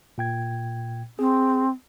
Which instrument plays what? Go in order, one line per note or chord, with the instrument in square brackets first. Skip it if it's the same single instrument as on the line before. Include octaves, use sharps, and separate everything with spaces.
[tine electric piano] A#2 G5 G#6
[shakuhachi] C4 [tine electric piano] G#4